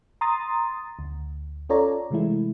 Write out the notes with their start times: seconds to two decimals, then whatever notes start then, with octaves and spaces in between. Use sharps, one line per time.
0.21 A#5 C6 D#6 A6
0.99 D2
1.69 C#4 F4 A4 C#5 D5 A#5
2.10 C3 E3 G#3 A3 E4